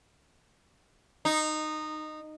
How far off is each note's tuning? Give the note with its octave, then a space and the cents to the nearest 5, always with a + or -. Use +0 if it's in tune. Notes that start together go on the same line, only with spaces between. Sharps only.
D#4 -15